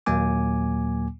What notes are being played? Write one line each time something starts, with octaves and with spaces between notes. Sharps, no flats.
D#2 A#2 F#3 A#3 G#5 D6